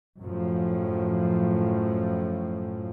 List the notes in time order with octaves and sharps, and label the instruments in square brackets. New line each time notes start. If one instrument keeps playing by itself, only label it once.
[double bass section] F#2 A2 F3